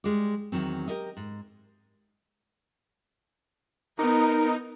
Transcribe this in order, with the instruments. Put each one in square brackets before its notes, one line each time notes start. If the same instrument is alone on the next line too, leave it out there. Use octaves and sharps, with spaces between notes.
[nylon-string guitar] G3 G#3 D5
E2 D#3 F#3 C4
G4 A#4 D#5
G#2
[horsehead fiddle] B3 [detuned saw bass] D#4 [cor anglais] A#4